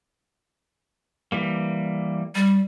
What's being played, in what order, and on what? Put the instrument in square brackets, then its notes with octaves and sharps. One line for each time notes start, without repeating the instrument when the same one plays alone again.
[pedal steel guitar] E3 G3 A#3
[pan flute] G3